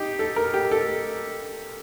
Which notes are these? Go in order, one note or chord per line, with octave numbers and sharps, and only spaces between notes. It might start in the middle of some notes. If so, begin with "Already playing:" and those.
Already playing: D#4 G4
A4
A#4
G4
A4